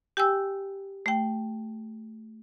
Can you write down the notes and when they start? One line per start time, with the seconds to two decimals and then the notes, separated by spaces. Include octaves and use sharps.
0.17 G4 G5 G#5 E6
1.06 A3 G5